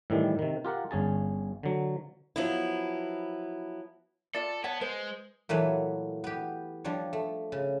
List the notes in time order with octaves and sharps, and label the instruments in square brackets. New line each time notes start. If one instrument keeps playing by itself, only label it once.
[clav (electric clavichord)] A2 D#3 E3 G3
C3 D#3
F4 G4 A#4 F#5
G1 C#4 G#4 A5
D3 F#3
[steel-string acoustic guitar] F3 F#3 B3 E4
[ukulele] F4 D5 [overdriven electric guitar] A4
[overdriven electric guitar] B3 [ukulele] C#5 F#5 A5
[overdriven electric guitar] G#3 [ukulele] B4 C5
[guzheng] A#2 E3 F#3 A3 B4 C#5
B3 G4
F3 G3 D4 C#5
A3
C#3